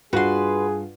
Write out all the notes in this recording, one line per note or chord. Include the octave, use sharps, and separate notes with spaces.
G2 F4 F#4 G#4 B4 F#5 C6